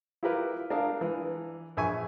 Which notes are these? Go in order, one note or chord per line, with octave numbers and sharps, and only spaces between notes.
E4 F4 G4 A#4 B4
D4 G#4 A#4 F5
E3
A#1 E5 G#5 C#6